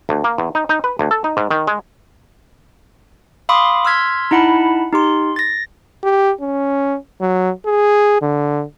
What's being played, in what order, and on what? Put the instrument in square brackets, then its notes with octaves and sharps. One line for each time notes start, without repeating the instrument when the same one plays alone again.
[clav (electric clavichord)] D2
A#3
E2
D#4
D#4
B4
D2
A4
D#4
G#2
D#3
G#3
[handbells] F5 B5 C6 D6 D#6
C6 E6 F6 G#6 B6
D#4 E4 F#5 A5 B5
D#4 G4 C6
A6 A#6
[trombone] G4
C#4
F#3
G#4
D3